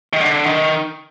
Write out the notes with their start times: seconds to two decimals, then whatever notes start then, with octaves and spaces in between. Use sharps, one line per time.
0.13 D#3
0.21 D3
0.46 D#3